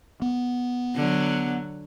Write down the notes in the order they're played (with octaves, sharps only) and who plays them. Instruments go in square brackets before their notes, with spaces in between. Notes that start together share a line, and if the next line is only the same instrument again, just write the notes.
[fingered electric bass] B3
[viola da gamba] D3 F#3